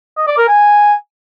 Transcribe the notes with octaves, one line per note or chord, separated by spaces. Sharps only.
D#5
D5
A#4
G#5